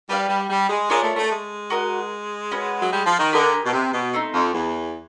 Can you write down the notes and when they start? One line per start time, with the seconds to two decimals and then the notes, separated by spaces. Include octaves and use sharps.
0.09 G3 G4 B4 D5 F5
0.29 G3
0.49 G3
0.69 G#3
0.90 G#3 C#4 F4 A#4 D5
1.03 A3
1.16 A3
1.31 G#3
1.70 F#4 A#4 D#5
2.51 C#4 F#4 B4
2.81 F#3
2.92 G3
3.05 F3
3.18 D#3
3.33 D3 G4 A#4 D#5 G#5
3.64 B2
3.72 C3
3.93 B2
4.13 A3 C4 D#4
4.33 F2
4.53 E2